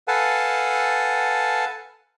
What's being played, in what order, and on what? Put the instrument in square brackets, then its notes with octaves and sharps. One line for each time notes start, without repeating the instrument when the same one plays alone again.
[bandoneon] A4 B4 F5 F#5 G#5 A5